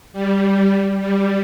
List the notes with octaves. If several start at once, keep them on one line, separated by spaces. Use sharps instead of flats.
G3
G3